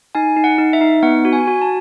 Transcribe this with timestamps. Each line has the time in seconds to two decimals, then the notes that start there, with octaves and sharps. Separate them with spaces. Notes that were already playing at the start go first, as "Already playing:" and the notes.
0.15 D#4 G#5
0.37 D#4
0.44 F#5
0.58 D#4
0.73 E5
0.81 D#4
1.03 B3 F#5
1.25 F#4
1.33 G#5
1.47 F#4
1.62 A5